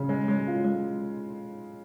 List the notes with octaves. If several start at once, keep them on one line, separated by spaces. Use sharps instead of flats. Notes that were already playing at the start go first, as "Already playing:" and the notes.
Already playing: C#3
G#3
G#3
F4
G#3